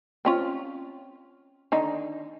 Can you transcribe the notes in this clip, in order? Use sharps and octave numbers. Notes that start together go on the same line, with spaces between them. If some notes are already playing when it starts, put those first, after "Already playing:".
C4 C#4 F4
D3 D#3 D#4